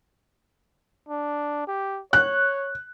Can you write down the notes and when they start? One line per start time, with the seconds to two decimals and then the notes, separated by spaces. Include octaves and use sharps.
1.09 D4
1.67 G4
2.13 C#5 F#6